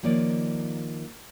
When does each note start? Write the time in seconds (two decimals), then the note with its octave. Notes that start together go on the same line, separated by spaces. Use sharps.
0.03 D#3 F3 A#3 C#5 D5